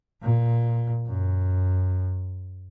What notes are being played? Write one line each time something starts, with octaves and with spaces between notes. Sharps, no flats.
A#2
F#2